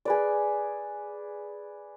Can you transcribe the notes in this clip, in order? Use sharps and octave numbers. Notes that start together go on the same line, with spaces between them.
G#4 B4 D5